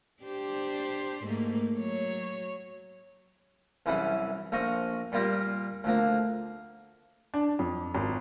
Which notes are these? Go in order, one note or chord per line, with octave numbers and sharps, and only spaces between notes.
D4 G4 C5
G#2 A3 A#3
F#3 C#5
C2 F#2 E3 E4 G#4 F#5
A#1 F3 D#5 C#6
A#2 G3 A#3 F4 G4 A#4
D2 F3 A#3
D4
F2
G#1